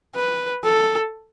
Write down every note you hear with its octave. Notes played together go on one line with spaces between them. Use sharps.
B4
A4